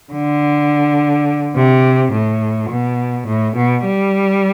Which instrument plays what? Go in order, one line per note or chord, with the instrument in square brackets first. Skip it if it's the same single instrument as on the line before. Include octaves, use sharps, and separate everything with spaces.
[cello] D3
C3
A2
B2
A2
B2
G3